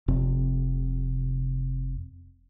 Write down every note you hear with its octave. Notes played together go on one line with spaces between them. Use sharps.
F1 C3